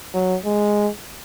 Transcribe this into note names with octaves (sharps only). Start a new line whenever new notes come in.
F#3
G#3